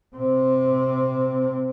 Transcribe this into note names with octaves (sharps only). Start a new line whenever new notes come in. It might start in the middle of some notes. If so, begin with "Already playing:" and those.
C3 C4